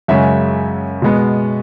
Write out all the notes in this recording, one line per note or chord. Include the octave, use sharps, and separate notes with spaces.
F#2 C#3 G#3 C#4 E5
B2 G#3 B3